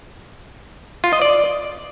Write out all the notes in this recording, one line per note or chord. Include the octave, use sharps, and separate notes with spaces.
F4
D#5
D5